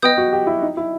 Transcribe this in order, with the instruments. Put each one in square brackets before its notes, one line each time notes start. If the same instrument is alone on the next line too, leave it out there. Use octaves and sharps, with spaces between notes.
[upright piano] B3 [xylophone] D#5 G5 D#6 G6
[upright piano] F#4
G4
E4
D#4
E4